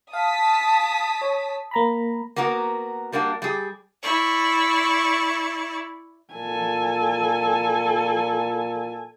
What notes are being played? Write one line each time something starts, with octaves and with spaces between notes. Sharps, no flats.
F5 A5 D#6 B6
C#5
A#3 A#5 B5
A#3 B3 F#4 A#4
G3 A#3 D4 F#4
G3 G#4
E4 D5 C#6
A#2 A4 G#5